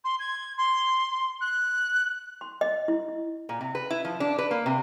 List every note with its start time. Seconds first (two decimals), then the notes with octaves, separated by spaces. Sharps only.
0.04 C6
0.19 G#6
0.57 C6
1.41 F#6
2.41 C6
2.61 D#5
2.88 E4
3.08 E4
3.49 A#2
3.61 C3
3.75 B4
3.90 E4
4.05 F3
4.20 D4
4.38 B4
4.51 A#3
4.66 C3